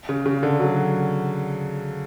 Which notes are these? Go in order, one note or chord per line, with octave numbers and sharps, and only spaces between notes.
C#3
C#3
D3
F#3